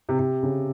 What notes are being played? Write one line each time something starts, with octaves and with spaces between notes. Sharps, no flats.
C3
C3
C#3